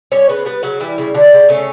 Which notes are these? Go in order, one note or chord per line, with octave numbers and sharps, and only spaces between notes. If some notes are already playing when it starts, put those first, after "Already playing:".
G3 C#4 C#5
C#3 B3 B4
G3 B3 B4
C#3 F#3 F#4
E3 G3 E4
C#3
D3 G3 D4
C#3
C#3 A3 C#4